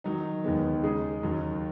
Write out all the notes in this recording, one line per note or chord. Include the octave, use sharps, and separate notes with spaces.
D#3 F#3 D#4
D#2 D#3 G#3 B3
C#3 G#3 D#4 G#4
D#2 D#3 F#3